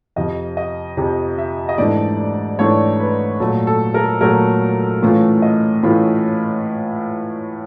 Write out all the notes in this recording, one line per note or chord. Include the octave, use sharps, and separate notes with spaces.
F2 C3 F3 D#5
D#5
F2 C3 F3
E5
D#5
G#2 E3 A3 D4 D5
G#2 E3 A3 D4 C#5
B4
A#2 F#3 A3 A4
A4
A#4
A#2 F#3 A3 A#4
A2 E3 A3 C#4 F4
D#5
A2 E3 A3 C#4 F4 B4